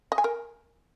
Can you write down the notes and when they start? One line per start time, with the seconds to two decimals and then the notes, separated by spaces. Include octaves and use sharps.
0.12 D#5
0.18 G#5
0.24 A#4